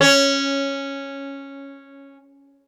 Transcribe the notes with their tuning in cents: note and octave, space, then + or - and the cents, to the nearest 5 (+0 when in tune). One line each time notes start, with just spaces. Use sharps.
C#4 -5